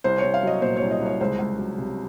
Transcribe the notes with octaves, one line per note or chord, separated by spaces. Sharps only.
C2 C5
C#5
C2
F5
F#3 D#5
A#2 C5
C2 C#5
D#5
C2 C#5
C#2 C5
C#2
F#3
C3